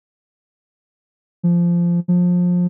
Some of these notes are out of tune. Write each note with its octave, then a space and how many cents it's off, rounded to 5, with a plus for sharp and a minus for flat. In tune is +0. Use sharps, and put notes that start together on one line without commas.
F3 -15
F3 +25